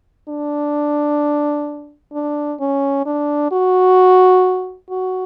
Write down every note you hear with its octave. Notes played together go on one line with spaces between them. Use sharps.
D4
D4
C#4
D4
F#4
F#4